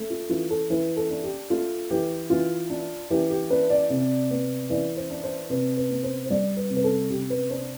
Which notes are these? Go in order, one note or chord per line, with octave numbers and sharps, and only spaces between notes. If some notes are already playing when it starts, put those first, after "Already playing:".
Already playing: A3
F4
E3 F4
A4
E3 B4
A4
D4
G4
A3 F4
E3 G4
E3 F4
D4
E3 G4
G4
D4 B4
D5
C3
B3
E3 D5
C5
D4
C5
C3 B4
B4
B3
C5
C5
G3 D5
B4
C3
B4
A4
C3 G4
B4
D4 C5